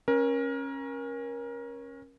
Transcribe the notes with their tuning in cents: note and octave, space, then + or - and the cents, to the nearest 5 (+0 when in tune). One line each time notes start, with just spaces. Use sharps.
C#4 -20 A#4 +25